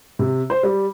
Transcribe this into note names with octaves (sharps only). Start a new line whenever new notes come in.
C3
C5
G3